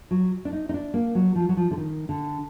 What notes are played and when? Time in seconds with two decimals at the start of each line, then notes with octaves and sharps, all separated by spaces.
0.11 F#3
0.45 D4
0.53 D#4
0.69 D#4
0.74 D4
0.94 A#3
1.15 F#3
1.36 F3
1.49 F#3
1.57 F3
1.71 D3
1.78 D#3
2.09 D3